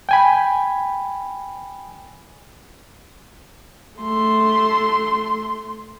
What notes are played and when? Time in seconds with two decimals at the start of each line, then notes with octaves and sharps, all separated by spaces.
0.09 G5 G#5 B5
4.00 A3 C6